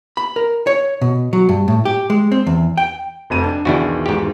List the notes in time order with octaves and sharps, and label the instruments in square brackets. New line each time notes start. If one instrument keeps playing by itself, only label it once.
[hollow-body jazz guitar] B5
A#4
C#5
B2
F#3
G2
A2
G4
G#3
C4
E2
G5
[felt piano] F1 F2 D#7
D4
[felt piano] B1 E2 D#3 [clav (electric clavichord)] D4 E4 F#4
[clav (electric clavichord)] G#2 G4